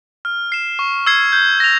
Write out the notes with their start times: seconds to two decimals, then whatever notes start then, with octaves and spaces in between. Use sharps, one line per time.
0.25 F6
0.52 C7 E7
0.79 C#6
1.07 E6 G#6 C7
1.33 G6
1.60 A#6 F7